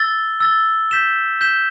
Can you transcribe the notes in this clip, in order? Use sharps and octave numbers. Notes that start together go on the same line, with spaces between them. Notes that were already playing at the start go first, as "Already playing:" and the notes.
Already playing: E6 A6 G7
E6 A6 G7
G6 B6 E7 G7
G6 B6 E7 G7